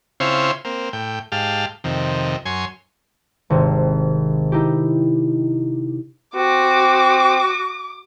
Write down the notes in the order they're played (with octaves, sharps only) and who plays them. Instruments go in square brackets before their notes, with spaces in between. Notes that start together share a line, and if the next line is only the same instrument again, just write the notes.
[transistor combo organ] C#3 C4 E4 F4 C5 C#5
A#3 C4
A2 G5
G#2 G4 F5 A5
F2 C3 D#3
F#2 C#5 G#5 C6
[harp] G#1 C3
D#4 E4 G4
[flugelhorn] C4 [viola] F#4 [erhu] D6